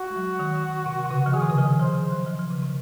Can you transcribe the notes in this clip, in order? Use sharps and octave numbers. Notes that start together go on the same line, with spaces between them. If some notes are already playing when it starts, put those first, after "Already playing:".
Already playing: F#4
G#3
F#3
D#3
C3
C3
C#3
F3
D#3 G#4
C3
C#3
F3
D#3
F3 C5
F#3
F3
F3
C#3
C3